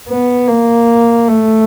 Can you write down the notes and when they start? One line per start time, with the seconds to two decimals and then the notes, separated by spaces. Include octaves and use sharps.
0.09 B3
0.48 A#3
1.28 A3